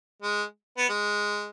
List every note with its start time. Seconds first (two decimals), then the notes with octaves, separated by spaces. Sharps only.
0.22 G#3
0.78 B3
0.89 G#3